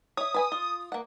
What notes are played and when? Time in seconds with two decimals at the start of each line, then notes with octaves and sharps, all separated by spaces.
0.17 C#5 E5 D#6
0.34 B4 G#5 B5
0.52 F4
0.92 A#3 F#5